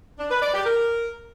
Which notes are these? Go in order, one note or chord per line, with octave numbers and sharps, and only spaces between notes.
D4
B4
D5
G4
A#4